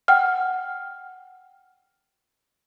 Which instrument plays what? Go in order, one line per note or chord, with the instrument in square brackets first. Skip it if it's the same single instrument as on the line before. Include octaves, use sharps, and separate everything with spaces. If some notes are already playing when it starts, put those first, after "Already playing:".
[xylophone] F#5 G5 F6